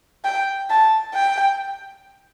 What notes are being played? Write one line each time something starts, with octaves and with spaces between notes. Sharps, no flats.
G5
A5
G5